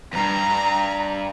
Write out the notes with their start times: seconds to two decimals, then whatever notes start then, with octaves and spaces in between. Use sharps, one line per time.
0.13 E2 G2 A#5